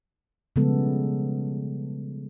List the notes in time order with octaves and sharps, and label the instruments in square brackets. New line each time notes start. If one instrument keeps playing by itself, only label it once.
[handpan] C#3 F3 G3 G#3 B3 A4